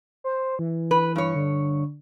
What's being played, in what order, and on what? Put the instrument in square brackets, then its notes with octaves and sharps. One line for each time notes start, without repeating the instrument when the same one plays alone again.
[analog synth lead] C5
E3
[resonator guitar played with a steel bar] B4
G2 C#5
[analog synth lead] D3